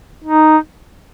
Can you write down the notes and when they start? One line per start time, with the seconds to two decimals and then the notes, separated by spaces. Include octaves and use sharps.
0.25 D#4